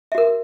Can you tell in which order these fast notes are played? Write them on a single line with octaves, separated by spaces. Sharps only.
E5 F#4 A#4